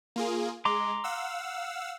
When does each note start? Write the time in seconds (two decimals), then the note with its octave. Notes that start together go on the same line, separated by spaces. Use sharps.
0.16 A#3 F4 G#4
0.65 G#3 A#5 C6 D6
1.04 F5 F#5 E6